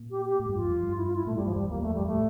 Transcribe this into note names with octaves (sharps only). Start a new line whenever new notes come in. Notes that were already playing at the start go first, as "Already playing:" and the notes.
Already playing: A#2
G4
G4
A2
G2
F4
F2
F2
G2
E4
F4
E4
A#2 A3
G3
G2
F3
E2 G3
F2
A#3
E2
F2 A3
F2 G3
A3
A2